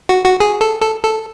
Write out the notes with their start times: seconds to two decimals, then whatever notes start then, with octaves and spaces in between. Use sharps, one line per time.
0.09 F#4
0.25 F#4
0.40 G#4
0.61 A4
0.81 A4
1.03 A4